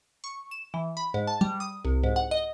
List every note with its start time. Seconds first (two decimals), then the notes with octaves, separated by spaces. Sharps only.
0.24 C#6
0.51 E7
0.74 E3
0.97 B5
1.14 G#2
1.27 A5
1.41 G3
1.60 D#6
1.85 C2
2.04 G#2
2.16 F#5
2.31 D#5